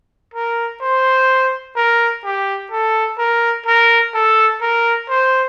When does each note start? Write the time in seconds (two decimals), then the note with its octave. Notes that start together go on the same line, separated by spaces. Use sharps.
0.34 A#4
0.82 C5
1.76 A#4
2.24 G4
2.72 A4
3.19 A#4
3.66 A#4
4.14 A4
4.61 A#4
5.09 C5